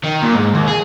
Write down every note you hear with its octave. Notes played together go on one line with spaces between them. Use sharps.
D#3
A#2
G#2
D#2
G#4